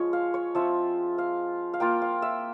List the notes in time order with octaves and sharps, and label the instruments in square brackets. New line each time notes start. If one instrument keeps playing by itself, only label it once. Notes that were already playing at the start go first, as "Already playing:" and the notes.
Already playing: [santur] F3 G#3 F4 C#5
F5
C#5
F3 C4 F4 E5
F5
F5
A#3 F4 G5
F5
E5